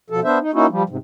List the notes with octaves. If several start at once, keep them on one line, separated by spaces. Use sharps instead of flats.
B2 F3 A4
B3 D4 C5 E5
D#4
A#3 C#4 D#4 E4 F#4
F3 G3
G#2 C3